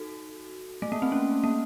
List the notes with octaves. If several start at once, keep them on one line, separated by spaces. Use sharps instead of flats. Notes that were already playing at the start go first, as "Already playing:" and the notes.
Already playing: D#4 F#4 A4
A3
A#3
C4
C#4
A#3